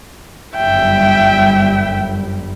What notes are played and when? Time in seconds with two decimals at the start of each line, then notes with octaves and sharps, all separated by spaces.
0.56 G1 F#2 G3 E5 G5